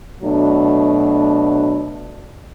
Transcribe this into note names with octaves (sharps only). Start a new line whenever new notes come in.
B2 F#3 A3 D4